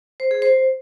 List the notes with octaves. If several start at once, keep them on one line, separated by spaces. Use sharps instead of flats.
C5
G#4
C5